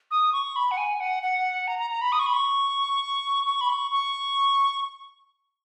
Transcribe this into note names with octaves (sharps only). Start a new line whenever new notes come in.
D#6
C#6
B5
F#5
G#5
F#5
F#5
A#5
A#5
A#5
B5
D#6
C#6
B5
C#6
C#6
B5
C#6
C#6